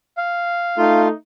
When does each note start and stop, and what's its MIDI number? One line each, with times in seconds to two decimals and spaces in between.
0.17 1.01 77
0.78 1.10 57
0.78 1.13 63
0.78 1.08 65